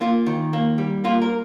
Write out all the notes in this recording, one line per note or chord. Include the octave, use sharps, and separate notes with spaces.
A#3 F4
D#3
A#3
G3
A#3 F4
A#4